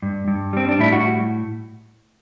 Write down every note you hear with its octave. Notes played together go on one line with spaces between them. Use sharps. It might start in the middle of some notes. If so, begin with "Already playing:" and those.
G2
G2
G3 C4
D4
A2 E4
F#4